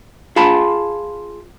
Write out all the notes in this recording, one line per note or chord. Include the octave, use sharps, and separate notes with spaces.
F4 G#4 A5 B5